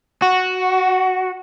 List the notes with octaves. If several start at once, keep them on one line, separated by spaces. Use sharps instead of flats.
F#4